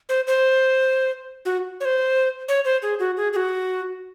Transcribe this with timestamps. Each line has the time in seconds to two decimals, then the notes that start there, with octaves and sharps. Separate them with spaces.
0.09 C5
0.27 C5
1.45 F#4
1.80 C#5
1.85 C5
2.48 C#5
2.65 C5
2.82 G#4
2.99 F#4
3.17 G#4
3.33 G#4
3.36 F#4